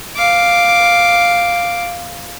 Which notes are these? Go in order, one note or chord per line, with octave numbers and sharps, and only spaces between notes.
F5 D6